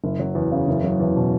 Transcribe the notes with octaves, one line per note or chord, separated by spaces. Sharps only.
F#1
F#3
E2
C#3
F#1
F#3
E2
B2